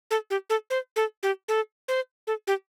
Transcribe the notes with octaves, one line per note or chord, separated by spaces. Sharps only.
A4
G4
A4
C5
A4
G4
A4
C5
A4
G4